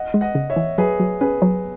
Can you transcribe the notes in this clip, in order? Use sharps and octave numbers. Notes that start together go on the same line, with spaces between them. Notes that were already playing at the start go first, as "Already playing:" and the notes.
Already playing: D#5 F#5
G#3
D#5 F#5
C#3
C#5 E5
E3
F#3 G#4 B4
F#3
C#4 G#4 B4
F#3